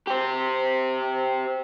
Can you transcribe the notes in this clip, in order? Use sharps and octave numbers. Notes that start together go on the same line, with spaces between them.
G4 C5